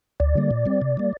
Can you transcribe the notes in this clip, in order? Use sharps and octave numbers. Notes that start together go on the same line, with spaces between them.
D2 D5
D3 G3 A#3
A#2
G3 C4
C3
G3 A#3